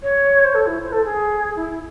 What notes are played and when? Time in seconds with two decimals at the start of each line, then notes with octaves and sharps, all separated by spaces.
0.03 C#5
0.44 C5
0.54 A4
0.66 E4
0.84 C5
0.92 A4
1.04 G#4
1.56 E4